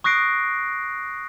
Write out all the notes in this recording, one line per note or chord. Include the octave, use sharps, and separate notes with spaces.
C#6 D#6 F#6 A#6 C7 D7